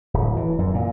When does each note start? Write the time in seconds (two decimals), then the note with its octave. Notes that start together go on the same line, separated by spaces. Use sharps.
0.14 D1
0.37 E3
0.59 F#2
0.74 A#2